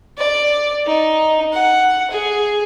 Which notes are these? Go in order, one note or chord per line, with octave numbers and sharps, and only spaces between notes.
D5
D#4
F#5
G#4